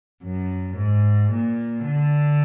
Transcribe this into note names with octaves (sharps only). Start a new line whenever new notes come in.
F#2
G#2
A#2
D3